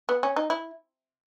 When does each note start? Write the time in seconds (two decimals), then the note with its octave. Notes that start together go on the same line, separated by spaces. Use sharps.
0.09 B3
0.23 C#4
0.36 D#4
0.50 E4